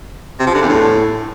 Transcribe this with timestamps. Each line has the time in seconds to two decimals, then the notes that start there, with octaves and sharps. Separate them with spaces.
0.39 C3
0.47 F3
0.54 D3
0.62 E2
0.69 A2